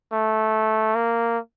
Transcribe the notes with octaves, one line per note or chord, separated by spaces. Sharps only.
A3
A#3